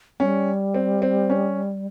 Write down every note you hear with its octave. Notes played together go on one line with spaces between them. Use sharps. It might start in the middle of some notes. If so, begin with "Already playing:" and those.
G3 C#4
C4
C4
C#4